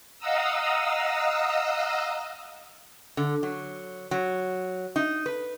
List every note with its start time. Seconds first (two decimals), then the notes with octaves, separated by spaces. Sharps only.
0.18 D#5 F5 F#5 A#5 D#6 E6
3.17 D3
3.43 F#3
4.11 F#3
4.96 D#4
5.26 B4